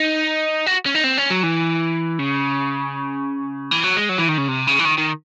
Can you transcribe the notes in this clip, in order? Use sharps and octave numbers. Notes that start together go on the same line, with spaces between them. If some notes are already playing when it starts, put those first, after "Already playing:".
Already playing: D#4
F#4
C#4
D#4
C4
C#4
F#3
E3
C#3
E3
F#3
G#3
F#3
E3
D#3
C#3
C3
C#3
E3
D#3
D#3